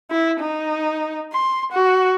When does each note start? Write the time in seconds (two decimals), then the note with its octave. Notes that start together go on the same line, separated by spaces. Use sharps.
0.10 E4
0.40 D#4
1.33 C6
1.72 F#4